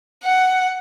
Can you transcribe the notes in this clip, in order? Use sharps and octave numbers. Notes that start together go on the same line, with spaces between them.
F#5